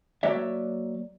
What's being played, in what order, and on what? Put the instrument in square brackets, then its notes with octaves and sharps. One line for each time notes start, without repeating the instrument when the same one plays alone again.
[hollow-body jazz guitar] F#3 A#3 F#4 C#5 D5 E5